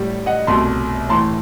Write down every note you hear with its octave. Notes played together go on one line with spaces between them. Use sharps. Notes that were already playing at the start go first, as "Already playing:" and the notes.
Already playing: A2 G3
D#5 F#5
C2 B2 A3 A5 C6
A2 E3 A3 A5 C6